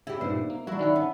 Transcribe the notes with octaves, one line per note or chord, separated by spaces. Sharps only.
C#3 E4 G4
G2 A#2 B3 D4 D#4 C5
A#3
F#3 G3 D4 E4 F#4 A#5
D#3 C#4 D#4 E5 F#5
B3